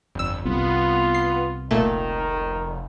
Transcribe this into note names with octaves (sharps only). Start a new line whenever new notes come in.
G1 F2 E6
C2 B3 F4
C7
F1 A#2 D#3 A3